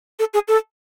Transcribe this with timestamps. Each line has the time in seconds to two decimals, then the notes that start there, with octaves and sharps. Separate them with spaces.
0.19 A4
0.34 G#4
0.48 A4